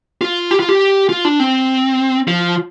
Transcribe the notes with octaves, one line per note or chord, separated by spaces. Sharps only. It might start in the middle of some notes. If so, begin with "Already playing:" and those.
F4
G4
F4
G4
F4
D4
C4
F3